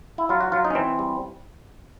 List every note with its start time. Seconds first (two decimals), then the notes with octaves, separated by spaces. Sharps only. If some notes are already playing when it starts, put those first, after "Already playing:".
0.18 E4
0.29 F#3 F4
0.41 F#4
0.52 F#3 F4
0.65 D#4
0.70 C#4
0.75 E3 C4
0.99 G3